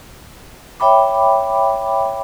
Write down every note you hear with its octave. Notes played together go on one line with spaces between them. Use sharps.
C#5 E5 G5 B5 D6